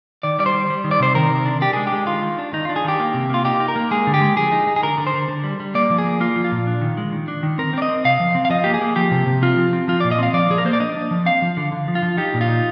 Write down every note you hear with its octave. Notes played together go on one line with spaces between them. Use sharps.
D#3 D5
G3 D5
C5
G3
G3
D#3
D5
C3 C5
D#3 A#4
C3
D4
D4 G4
G#3 G#4
G4
G#3
D#3 F4
D#3
D4
D#3 D#4
D4 F4
G#4
D#3 G4
A#3
C3
A#3 F4
D#4 G4
D#4
A#4
A#3
G#3 G#4
D3
G4
G#3
F3 G#4
D#4
D#4
G#4
D3 A#4
D3
C5
D3
D3
G3
G3
A#3 D5
F3
G#4
A#3
A#3 F4
F3
F4
A#2
D4
D#3
G#3
D#3
D4
D#3
C4 A#4
C4 D5
D#5
C4
C3 F5
F3
C4
F5
F3 D#5
A#3 G4
G#4
A#3
F3 G4
C3
C3
C4 F4
F3
C4
F3 F4
A#2 D5
D#5
C4 F5
F3 D5
F3 G#4
A#4
A#3 C5
D5
D4 D#5
D4
F3
C4 F5
F3
D3
D3
F3
F4
F3
D#4 G4
A#2
F4
D#4